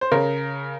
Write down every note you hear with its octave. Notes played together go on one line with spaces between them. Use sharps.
C5
C#3 A#4